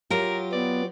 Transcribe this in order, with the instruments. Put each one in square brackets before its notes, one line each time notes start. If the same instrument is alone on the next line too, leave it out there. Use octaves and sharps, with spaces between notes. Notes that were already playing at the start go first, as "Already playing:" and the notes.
[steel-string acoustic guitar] F#3 F4 G4 [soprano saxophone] A#4
[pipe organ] B3 [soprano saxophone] D5